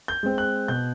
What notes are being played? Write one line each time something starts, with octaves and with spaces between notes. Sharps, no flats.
G6
G#3 C4
F#6
B2 G6